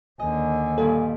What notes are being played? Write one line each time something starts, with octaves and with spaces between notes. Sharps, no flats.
D#2 D3 D#5 G#5
G2 A#2 D#3 A4